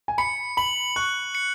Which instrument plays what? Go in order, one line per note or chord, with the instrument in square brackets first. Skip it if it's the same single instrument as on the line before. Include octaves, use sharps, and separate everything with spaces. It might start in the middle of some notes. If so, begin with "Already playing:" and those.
[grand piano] G#5
[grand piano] B5 [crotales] C#7
[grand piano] B5 [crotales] F#7
[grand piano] C#6 [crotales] F#6
[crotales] C#7